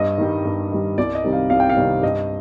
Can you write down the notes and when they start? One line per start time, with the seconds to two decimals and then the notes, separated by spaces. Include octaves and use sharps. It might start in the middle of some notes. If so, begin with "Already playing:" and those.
Already playing: G2 D#5
0.18 D#3 G3
0.45 G2
0.72 D#3 G3
0.98 C2 D5
1.15 D#5
1.24 C3 D#3 G3
1.33 F5
1.50 C2 F5
1.60 G5
1.70 F5
1.77 C3 D#3 G3
2.03 G2 D#5